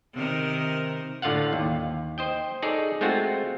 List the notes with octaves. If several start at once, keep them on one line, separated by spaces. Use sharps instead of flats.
C3 D#3 A#4
A2 D3 F4 F5 F#5
D#2
C5 D#5 G5
D#4 G#4 A4 C#5 D5
G#3 A3 C4 F4 F#4